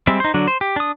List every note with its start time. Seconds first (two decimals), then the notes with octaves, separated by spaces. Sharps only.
0.07 G3 G#3 C4 E5
0.20 D#4 C5
0.34 D3 F#3 D4
0.48 C5
0.61 G4
0.76 D4 D#6